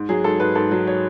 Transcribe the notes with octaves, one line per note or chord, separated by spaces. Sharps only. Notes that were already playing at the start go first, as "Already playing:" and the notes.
Already playing: G#2
F#3 G#4
G#2 A4
G#2 B4
G#2 A4
F#3
C#5